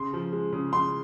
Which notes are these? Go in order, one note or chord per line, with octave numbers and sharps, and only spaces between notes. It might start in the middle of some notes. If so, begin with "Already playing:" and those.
Already playing: C#3 C6
F3
G#3
C#3
C#3 C6